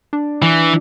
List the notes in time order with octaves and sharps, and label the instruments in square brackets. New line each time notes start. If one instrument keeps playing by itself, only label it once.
[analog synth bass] D4
[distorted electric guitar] E3